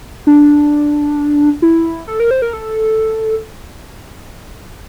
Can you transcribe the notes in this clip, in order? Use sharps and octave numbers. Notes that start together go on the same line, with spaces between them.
D4
E4
A4
A#4
C5
A#4
A4